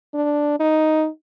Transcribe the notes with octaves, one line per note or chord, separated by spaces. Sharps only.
D4
D#4